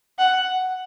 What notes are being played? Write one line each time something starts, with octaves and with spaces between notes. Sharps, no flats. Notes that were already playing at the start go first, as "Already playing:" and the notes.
F#5